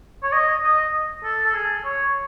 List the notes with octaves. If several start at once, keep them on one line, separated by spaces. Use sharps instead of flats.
C#5
D#5
D#5
A4
A4
G#4
C#5